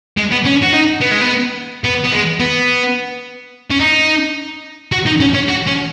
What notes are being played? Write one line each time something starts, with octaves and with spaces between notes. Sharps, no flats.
G#3
B3
C#4
F#4
D#4
B3
G#3
B3
B3
B3
G#3
B3
C#4
D#4
F#4
D#4
C#4
C#4
F#4
C#4